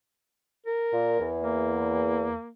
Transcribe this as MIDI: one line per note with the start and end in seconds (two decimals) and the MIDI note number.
0.66 1.29 70
0.93 1.19 46
1.19 2.32 40
1.43 2.50 58